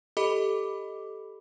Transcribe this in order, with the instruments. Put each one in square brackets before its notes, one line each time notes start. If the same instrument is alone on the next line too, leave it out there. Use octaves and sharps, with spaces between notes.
[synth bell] G4 A4 D#5 B5 D6